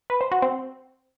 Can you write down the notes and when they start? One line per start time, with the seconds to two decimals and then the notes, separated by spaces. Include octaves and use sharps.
0.10 B4
0.21 C5
0.31 F#4
0.42 C4